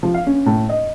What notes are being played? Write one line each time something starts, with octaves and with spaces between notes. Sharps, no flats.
F3
F5
C#4
A2
D#5